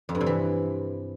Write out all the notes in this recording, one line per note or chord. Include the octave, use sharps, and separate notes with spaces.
F2
G2
C3
E3